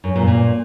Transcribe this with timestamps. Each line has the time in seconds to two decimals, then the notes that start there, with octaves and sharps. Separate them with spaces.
0.04 F#2
0.16 A#2
0.27 A#2